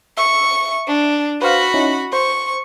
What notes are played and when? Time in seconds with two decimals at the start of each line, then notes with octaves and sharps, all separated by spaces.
0.17 E5 C#6
0.88 D4
1.42 F#4 B4 C5 F5 B5
1.74 C#4 D#4 E4
2.13 C5 C#6